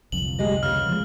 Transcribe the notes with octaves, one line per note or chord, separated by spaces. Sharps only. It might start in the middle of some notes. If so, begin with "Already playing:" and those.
G1 C2 F2 F#7
G#3 G4 D#5
C#3 B3 F6
F3 G3 G#3